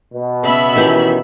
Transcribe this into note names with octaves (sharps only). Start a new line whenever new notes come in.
B2
C#3 B3 E5 B5
D#3 E3 C#4 G4